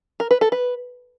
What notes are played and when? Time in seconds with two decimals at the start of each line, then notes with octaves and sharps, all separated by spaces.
0.20 A#4
0.31 B4
0.41 A4
0.52 B4